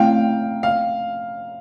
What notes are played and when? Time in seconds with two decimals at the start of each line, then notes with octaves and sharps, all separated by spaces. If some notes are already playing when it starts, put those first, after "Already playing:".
Already playing: A3 C4 E4 F5 G5
0.63 F5